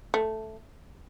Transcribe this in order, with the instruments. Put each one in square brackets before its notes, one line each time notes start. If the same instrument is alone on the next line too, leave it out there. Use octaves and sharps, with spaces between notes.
[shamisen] A3